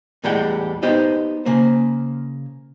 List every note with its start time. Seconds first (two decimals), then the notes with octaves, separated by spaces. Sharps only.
0.24 E2 A2 G3 G#3 F#5 G5
0.83 B3 D#4 G4 C5 D#5
1.46 C#3 A#3 C5